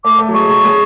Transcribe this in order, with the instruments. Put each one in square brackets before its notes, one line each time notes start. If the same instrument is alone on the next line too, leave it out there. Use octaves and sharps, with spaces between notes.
[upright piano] A3 [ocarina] D6
[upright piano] A3
F#3
[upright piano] G#3 [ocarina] C#6
[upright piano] F#3
G#3